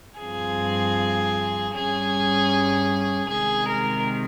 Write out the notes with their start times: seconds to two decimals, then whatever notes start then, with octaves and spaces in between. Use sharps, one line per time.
0.19 G2 F3 C4 G#4
1.74 G2 G3 C#4 G#4
3.29 C3 D#3 G#3 G#4
3.68 A#4